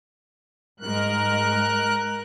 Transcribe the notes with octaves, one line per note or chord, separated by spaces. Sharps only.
G#2 G#3 A#4 F#6